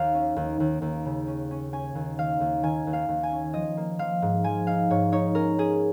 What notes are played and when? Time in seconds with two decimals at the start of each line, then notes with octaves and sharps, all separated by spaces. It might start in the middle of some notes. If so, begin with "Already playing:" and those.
Already playing: D#2 F5
0.15 C#4
0.36 D#2
0.60 D#2
0.82 D#2
1.05 C#3
1.27 C#4
1.51 C#4
1.73 C#4 G#5
1.95 D#2
2.18 D#3 F5
2.40 D#2
2.63 D#3 G#5
2.87 D#2
2.93 F5
3.08 D#2
3.23 G#5
3.32 C#4
3.54 F3 D#5
3.77 A#3
3.99 F3 F5
4.22 G#2
4.44 F3 G#5
4.67 D#4 F5
4.90 G#2 C#5
5.12 D#4 C#5
5.35 C#4 A#4
5.58 C#4 G#4